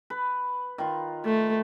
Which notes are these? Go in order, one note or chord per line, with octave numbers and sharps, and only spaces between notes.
B4
D#3 F4
A3